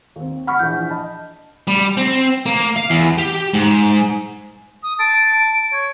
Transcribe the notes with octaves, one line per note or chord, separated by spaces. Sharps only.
D#2 C4
F#5 B5 C#6 F6 B6
A#1 E3 G6
D#5 A5 B5
G3
C4
A#3
F5
E2
G4
G#2
D#6
A5 D7
C#5